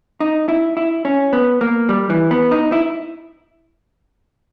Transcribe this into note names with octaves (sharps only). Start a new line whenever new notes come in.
D#4
E4
E4
C#4
B3
A#3
G3
E3
B3
D#4
E4